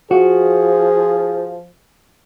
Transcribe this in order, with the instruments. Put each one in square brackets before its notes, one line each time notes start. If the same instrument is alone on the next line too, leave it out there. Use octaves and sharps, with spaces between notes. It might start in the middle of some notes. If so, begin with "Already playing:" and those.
[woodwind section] F3 [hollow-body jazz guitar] F#4 [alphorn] G#4